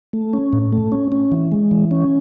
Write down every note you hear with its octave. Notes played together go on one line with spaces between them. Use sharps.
A3
C#4
A2
A3
C#4
C#4
E3
G#3
E3
C#4